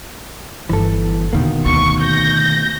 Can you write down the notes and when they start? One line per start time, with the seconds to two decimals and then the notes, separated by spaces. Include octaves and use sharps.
0.69 G1 E3 A4
1.33 E2 B2 D3 D#3 A#3
1.66 D2 B3 C#6
2.02 G6 A#6